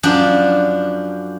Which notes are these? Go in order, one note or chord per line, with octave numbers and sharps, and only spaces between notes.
F#2 F3 D4